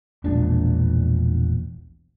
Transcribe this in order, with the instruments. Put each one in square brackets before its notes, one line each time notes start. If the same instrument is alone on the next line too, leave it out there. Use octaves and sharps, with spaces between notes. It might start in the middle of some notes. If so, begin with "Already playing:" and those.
[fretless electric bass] E1 A#1 D4